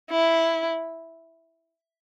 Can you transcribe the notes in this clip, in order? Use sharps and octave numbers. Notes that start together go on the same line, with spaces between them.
E4